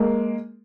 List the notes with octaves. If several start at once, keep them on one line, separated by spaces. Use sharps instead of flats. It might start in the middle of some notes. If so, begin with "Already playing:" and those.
Already playing: G#3 A#3